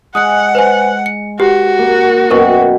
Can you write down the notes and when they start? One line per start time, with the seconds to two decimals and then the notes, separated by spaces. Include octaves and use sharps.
0.15 G#3 F#5 D#6 F#6 C#7
0.55 B4 C5 G#5
1.06 C#7
1.40 F#4 G4 B4
1.79 A#3
2.31 F#2 B2 A#4 B4 G5 C#6